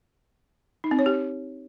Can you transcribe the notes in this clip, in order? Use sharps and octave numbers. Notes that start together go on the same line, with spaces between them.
D#4
C4
C#5
G4